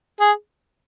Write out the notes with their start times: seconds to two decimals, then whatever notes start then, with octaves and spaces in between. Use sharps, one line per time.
0.20 G#4